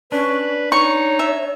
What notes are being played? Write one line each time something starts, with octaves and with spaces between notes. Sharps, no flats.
C#4 D4 B4
D#4 C#5 C#6
E5